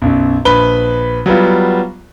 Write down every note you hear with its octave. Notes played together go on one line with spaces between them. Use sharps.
B1 F#2
A#1 B4 B5 G7
F#3 G3 B3 F4